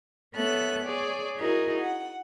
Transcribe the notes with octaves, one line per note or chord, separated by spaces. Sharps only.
B3 A4 C#5 E5 F#6
G#4 C#5 D5
D#4 E4 F#4 G#4 A#4
F#5